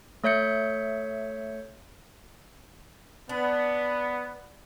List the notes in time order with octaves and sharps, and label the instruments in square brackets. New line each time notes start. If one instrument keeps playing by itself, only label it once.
[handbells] A3 C#5 E5 G6 C#7
[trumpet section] B3 [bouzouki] D4